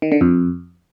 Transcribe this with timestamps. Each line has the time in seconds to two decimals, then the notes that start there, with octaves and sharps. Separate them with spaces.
0.02 D#3
0.12 D3
0.21 F2